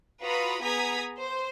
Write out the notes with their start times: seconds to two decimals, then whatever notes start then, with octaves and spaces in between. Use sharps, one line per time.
0.21 F4 F#4 B4 A#5 B5 D#6
0.62 B3 G#4 A#5 D#6 G#6 B6
1.19 C5